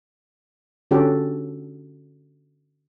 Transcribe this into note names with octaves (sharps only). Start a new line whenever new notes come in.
D3 C#4 F#4 G4 A4